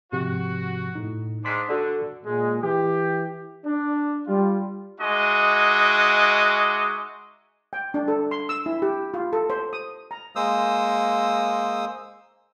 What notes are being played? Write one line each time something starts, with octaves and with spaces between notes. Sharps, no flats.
G#2 C3 F3 F#4
A2 D#4
G#2 D4 C6 B6
D3 F#4 A4 D5
A#2 G#3
E3 G4
D4
G3 F4
G#3 D#4 F#4 D#5 E5 D6
G5
D4
A4
C6
E6
E4
G4
F4
A4
C5
D#6
A#5
G#3 A#3 C5 D#6 E6